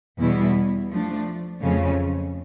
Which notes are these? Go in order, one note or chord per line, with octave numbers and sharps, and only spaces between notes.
E2 B2 G3 B3 E4
F3 A3 D4
F2 C#3 F#3 A3 C#4